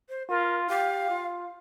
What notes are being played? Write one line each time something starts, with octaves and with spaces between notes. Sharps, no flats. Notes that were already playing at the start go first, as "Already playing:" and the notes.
C5
F4 A#4
G4 F5
F4